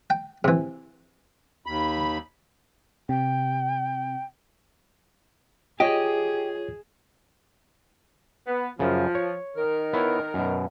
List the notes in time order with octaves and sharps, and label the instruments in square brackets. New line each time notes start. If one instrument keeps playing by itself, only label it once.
[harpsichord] G5
C3 E3
[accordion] D#2 B5
[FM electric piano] C3 [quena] G5
[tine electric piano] F4 C#5 [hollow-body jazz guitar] G4 [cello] G#4 [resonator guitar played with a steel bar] D#5
[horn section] B3
[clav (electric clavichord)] F#2 C#3 [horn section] F3
[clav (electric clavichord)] C#5
[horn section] D#3 A#4
[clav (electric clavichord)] B3 E4 C#5
F#2 B2